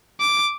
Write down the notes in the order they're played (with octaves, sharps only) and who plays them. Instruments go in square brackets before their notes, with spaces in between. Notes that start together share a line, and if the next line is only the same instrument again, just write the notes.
[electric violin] D6